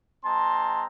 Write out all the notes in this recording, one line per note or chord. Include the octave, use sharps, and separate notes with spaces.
G#3 C4 A5 A#5 C6